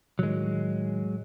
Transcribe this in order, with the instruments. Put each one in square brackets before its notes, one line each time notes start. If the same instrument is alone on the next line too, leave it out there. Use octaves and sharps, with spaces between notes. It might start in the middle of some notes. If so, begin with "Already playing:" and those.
[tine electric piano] A2 D#3 [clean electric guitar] F#3 G#3